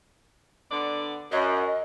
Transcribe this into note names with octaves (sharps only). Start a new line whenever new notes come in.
D3 B3 D5
F#2 D#5